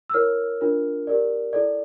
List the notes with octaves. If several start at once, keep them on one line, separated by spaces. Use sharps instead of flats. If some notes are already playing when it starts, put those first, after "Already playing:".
E6
E4 A#4 C#5 F6
D4 F4 A#4
G4 A#4 D5
E4 A4 D5